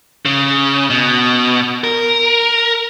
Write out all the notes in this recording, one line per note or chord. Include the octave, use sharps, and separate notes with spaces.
C#3
B2
A#4